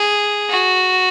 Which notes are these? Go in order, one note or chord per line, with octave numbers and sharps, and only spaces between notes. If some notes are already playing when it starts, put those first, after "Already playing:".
Already playing: G#4
F#4